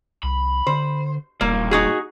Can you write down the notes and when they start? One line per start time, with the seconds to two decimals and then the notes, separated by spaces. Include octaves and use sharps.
0.23 C2 B5
0.67 D3 C5
1.41 E1 G2 A#2 A#3
1.71 D#4 F#4 G#4